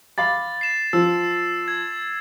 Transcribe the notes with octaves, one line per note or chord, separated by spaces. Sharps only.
F5 B5 D6 A6
C7 E7
F3 E6
G#6